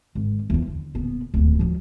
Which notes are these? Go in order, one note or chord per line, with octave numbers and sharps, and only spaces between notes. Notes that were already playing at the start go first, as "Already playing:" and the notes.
G#1
E2 F3
D3
D#1 B3
D1 D#2
F3 F#3